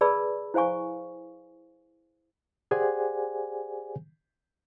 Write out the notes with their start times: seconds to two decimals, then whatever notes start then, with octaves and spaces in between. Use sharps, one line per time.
0.01 G#4 B4 D5 A5 B5 E6
0.54 E4 C5 F5 G#5 C#6
2.71 G4 G#4 C5 D5 F#5 G#5